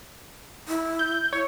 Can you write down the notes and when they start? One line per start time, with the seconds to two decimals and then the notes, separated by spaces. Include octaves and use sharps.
0.68 E4
0.99 G6
1.33 E4 C#5